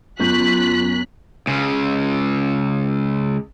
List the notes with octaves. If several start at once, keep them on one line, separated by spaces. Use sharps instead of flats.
F#2 B3 F4 C#6 F#6 G6 B6
C#2 C#3